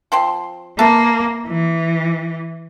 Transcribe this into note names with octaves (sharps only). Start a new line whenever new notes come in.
F3 C4 C6
A#3 B4 E5 A5
E3